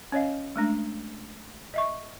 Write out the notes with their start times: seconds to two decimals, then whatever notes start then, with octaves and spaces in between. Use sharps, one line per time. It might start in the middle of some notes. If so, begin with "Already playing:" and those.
0.12 C#4 C#5 D#5 F5
0.56 G#3 A3 D4
1.74 D#5 E5 C#6